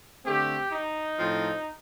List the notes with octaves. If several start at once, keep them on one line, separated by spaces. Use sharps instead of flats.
D3 A3 C4 G4
D#4
A2 F3 C4